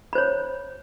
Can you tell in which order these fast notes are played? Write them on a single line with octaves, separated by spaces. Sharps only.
B5 C5 C#5